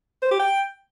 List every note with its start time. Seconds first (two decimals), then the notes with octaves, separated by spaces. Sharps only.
0.22 C5
0.31 G4
0.39 G5